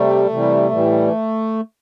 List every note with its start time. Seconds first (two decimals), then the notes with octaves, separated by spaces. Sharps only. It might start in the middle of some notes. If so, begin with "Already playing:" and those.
Already playing: C3 G3 A3
0.29 C3 E3 G3
0.71 A2 E3 G3